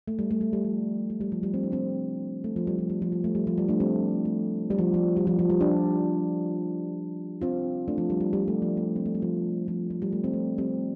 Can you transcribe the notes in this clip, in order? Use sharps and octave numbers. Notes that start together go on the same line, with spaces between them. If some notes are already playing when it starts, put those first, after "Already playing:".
A3
G3
A3
G3
G3
F3
G3
G3
F3
G3
C4
D4
G3 C4
A3
F3
G3
F3
G3
F3
G3
A3
G3
F3
G3
A3 D4
G3 C4
A3
G3
F3
F3
G3
F3
F3
G3
D4 G4
C4 F4
A3 D4
F3
G3
G3
G3
A3
F3
A3
C4
A3
G3
F3
F3
F3
G3
A3
C4
A3
G3 C4